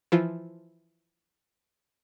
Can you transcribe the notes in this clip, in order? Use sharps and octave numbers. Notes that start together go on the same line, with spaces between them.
E3 F3 F4